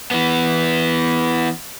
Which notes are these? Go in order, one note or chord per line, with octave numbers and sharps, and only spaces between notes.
E3 B3